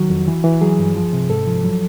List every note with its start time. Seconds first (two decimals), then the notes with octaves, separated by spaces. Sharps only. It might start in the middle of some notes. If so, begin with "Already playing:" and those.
Already playing: D#3 F#3 F#4
0.10 F2
0.28 E3
0.44 E3
0.61 F#3 G#4
0.79 G2
0.96 F3
1.13 C3
1.30 G#2 A4
1.47 F3
1.64 F#3